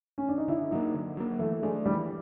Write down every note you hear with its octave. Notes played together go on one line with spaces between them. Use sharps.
C#4
D4
D#4
D3 E4
F#3 A#3 D#4
D3
F#3 A#3
E3 A3
G#3 A3 D4
E3 G3